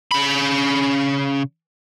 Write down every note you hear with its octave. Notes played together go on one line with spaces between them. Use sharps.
C#3 B5